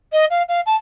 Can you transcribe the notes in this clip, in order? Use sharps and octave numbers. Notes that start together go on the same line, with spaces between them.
D#5
F5
F5
A5